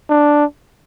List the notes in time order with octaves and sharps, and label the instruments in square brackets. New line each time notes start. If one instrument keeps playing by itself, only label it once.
[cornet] D4